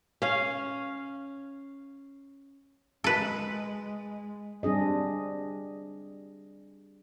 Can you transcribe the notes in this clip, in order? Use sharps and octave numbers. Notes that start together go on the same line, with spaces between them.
C#4 F5
G#3 A4 B4
G3 C4 D4 G#4 D#5